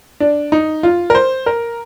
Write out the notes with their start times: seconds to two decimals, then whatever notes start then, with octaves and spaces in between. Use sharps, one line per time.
0.20 D4
0.52 D#4
0.83 F4
1.10 A#4
1.15 C5
1.46 A#4